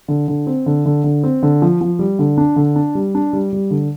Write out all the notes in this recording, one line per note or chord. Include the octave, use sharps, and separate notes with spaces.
D3
D3
C4
D3
D3
D3
C4
D3
F3
F3
G3
D3
D4
D3
D4
G3
D4
G3
G3
D3